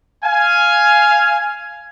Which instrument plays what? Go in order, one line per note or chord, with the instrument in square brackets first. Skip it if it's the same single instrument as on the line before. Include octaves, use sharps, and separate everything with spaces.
[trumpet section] F5 G#5